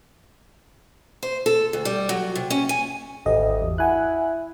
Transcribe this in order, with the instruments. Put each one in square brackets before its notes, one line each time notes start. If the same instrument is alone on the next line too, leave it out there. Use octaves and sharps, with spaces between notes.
[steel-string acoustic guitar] C5
A4
D2
G3
F#3
C3
C#4
G#5
[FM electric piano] G#1 G4 D#5 [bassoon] D2
[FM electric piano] E2
[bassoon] E4 [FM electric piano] F#5 G#5 F#6